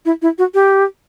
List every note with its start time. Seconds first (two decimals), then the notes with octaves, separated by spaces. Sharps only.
0.05 E4
0.22 E4
0.38 F#4
0.54 G4